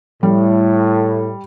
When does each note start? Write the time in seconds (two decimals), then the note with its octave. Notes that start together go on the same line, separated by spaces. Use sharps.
0.23 A2 G3